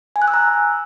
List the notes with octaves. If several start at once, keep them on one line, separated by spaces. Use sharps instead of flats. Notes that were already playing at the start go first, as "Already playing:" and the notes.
G#5
F#6
E6
A#5